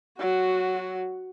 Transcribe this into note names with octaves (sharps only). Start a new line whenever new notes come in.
F#3 F#4